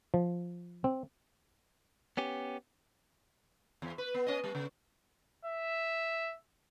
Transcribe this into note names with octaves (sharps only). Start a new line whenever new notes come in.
F3
C4
B3 C#4 G4
E2
B4
B3
C#4 D#5
G3
C#3
E5